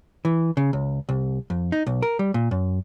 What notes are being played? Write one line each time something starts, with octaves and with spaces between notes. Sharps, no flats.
E3
C#3
C#2
C2
F2
D#4
B1
A#4
G3
A#2
F#2